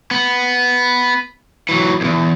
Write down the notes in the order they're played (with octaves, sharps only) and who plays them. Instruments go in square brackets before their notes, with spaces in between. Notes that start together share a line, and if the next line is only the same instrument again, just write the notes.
[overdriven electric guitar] B3
E3 F#3
B1 E2